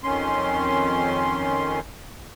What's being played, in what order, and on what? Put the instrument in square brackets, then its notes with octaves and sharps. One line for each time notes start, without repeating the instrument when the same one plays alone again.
[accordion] F2 D#3 C#4 C6